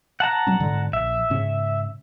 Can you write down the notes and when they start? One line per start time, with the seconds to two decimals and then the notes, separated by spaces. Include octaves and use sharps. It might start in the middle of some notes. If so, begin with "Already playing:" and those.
0.20 F#5 A5 A#5
0.47 F#3 G3 C#4
0.60 G#2 D3
0.93 A#1 E5
1.30 G#2 C#3 C#4